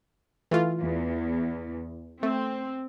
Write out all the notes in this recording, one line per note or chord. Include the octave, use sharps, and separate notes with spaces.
E3 A3 F4
E2
A3 C4